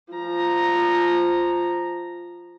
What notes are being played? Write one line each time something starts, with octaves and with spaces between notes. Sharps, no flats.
F3 A#5